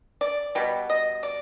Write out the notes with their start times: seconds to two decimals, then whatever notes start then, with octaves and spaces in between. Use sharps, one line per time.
0.21 D5
0.55 B2 G3
0.90 D#5
1.23 D5